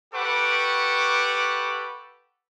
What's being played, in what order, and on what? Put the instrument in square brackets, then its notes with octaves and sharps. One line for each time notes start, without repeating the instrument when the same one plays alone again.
[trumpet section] G4 A4 B4 F#5 C#6 D6